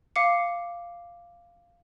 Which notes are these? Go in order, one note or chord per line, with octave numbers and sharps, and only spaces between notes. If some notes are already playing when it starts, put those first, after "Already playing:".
F5 D6 C#7